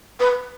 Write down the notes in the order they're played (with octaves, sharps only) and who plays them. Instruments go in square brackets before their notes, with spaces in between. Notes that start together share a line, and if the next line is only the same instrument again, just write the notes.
[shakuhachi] B4